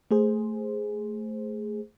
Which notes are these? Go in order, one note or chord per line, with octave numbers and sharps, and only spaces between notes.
A3 G#4 C5